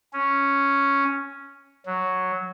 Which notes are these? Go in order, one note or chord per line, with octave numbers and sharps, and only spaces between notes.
C#4
F#3